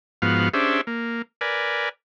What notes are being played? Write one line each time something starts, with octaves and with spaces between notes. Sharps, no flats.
G#2 F3 B3 F#4 F5
C#4 D4 G4 G#4 C5 E5
A#3
A#4 B4 D5 G#5